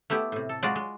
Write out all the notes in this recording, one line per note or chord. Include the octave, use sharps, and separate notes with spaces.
A3 B3 E4 G4
A2 C3
A4
F#3 G#3 F4 F#4 D5
G#3